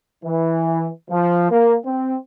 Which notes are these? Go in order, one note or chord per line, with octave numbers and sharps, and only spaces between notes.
E3
F3
A#3
C4